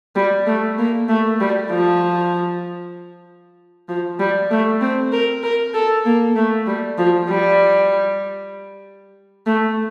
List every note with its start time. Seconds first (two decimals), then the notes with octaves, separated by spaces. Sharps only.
0.16 G3
0.47 A3
0.78 A#3
1.09 A3
1.41 G3
1.71 F3
3.89 F3
4.19 G3
4.51 A3
4.81 C4
5.12 A#4
5.43 A#4
5.74 A4
6.05 A#3
6.36 A3
6.67 G3
6.98 F3
7.29 G3
9.46 A3